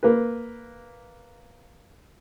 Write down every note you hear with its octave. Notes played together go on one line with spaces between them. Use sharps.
A#3 B4